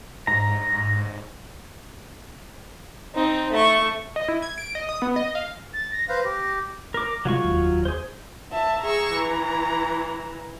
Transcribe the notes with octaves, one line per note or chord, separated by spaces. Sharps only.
G#2 A#5
C4 D#4
A3 C#6
D#5
E4
G#6
D7
D#5
D#6
B3
D#5
F5
A6
A#6
B4 C5 F5
G4
A#4 D6
C3 F#3 G#3 F4 C#6
F1 D#2
G#4 C5
E5 A5
G#4 A#5 C#6 E6
E3